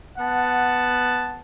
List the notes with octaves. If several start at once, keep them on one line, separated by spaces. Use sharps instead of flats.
B3 F#5 A5